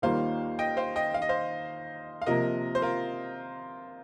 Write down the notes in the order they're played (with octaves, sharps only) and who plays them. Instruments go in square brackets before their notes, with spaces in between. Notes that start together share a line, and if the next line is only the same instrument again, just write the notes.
[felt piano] D#2 D#3 G3 A#3 F4 [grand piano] C5 F5
[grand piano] D#5 G5
C5 F5
D#5 G5
F5
D#5
C5 F5
F5
[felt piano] C3 F3 A#3 [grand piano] A#4 D#5
[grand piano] C5
F4 A#4